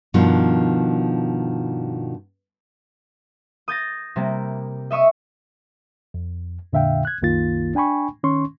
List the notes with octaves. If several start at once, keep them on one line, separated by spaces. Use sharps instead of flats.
G2 B2 D#3 F3 D4
D#6 G6 A6 A#6
C3 G3 A#3
D#5 E5 C#6 D#6
F2
F2 A#2 D3 E5 F5 G5
F#6 G#6
C2 F#2 D#3 A#3 F4 A6
D4 G5 G#5 B5 C#6
D#3 C#4 C6 C#6